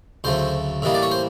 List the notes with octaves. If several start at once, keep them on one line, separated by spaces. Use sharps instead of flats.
D2 C#3 F#3 A3 C5
A2 E3 G3 A#3 D#5
D5
C#5
C5